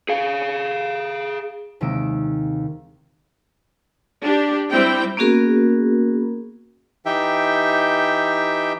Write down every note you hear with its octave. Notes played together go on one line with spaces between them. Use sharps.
G#4 F5
D#2 C3 G#3 E6 D7
D4 G4
G3 C4 E4 G5
A#3 B3 C#4 F#4 G#4 A#4
E3 D#4 G4 E5 G5